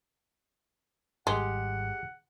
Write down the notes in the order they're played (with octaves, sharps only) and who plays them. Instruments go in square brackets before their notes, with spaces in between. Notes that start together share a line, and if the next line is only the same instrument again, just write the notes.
[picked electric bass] G#1 G3 [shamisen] G#3 [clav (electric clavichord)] G4 G#4 [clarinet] F#5